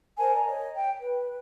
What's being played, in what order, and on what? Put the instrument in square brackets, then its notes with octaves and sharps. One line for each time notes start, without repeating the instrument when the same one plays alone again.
[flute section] A#4 C5 G#5 A5
D5 A#5
C#5 D#5
G5
B4